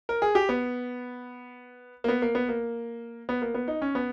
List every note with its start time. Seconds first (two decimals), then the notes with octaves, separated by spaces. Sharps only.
0.09 A#4
0.22 G#4
0.35 G4
0.49 B3
2.04 A#3
2.08 B3
2.22 A#3
2.35 B3
2.49 A#3
3.29 B3
3.42 A#3
3.54 B3
3.68 D#4
3.82 C#4
3.95 B3